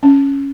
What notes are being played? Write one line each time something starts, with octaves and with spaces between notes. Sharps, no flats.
C#4